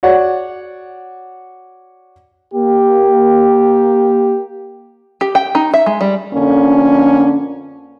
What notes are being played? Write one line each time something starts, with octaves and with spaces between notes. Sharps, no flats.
F#4 C#5 D5 F#5
A#3 G4
G4
G5
D#4
E5
G#3
G3
F2 D3 A#3 C#4 D4